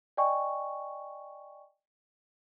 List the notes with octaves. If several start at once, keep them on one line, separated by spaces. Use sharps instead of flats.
D5 D#5 G5 G#5 C#6